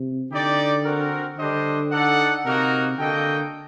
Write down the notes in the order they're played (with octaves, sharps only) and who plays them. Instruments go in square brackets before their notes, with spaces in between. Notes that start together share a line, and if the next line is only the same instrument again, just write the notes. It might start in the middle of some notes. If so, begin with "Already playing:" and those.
Already playing: [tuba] C3
[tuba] D3 [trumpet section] D#4 G4 D5 G5
[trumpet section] C4 F#4 A#4
[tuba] D3 [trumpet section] G3 D4 G4 C5 D#5
[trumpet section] D#4 A4 D5 F#5
[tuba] C3 [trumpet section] A#3 D#4 F#4 A#4
[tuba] D3 [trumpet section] A#3 F#4 A4 D#5 G5